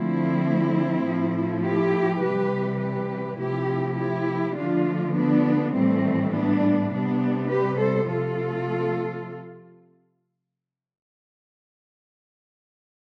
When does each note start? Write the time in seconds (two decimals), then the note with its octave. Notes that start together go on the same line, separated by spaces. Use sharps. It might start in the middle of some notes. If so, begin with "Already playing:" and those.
Already playing: D3 F3 A3 C4 E4
1.05 A2 F3 A3
1.63 E4 G4
2.22 C3 E3 G3 G4 B4
2.80 G4 B4
3.39 C3 F3 A3 E4 G4
3.98 E4 G4
4.57 D3 F3 A3 D4 F4
5.16 B3 D4
5.74 A2 E3 G3 A3 C4
6.33 B3 D4
6.92 C3 G3 B3 D4
7.51 G4 B4
7.80 A4 C5
8.10 C3 F3 A3 F4 A4